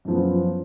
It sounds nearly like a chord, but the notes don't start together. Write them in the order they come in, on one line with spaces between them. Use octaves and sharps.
F#2 F3 B3